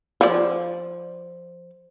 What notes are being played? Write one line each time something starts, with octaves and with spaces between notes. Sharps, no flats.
F3 D5